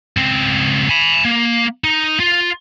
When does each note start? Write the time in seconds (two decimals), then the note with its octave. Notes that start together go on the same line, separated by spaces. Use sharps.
0.17 C#2 C4
0.89 G#5 B5
1.25 A#3
1.84 D#4
2.20 F4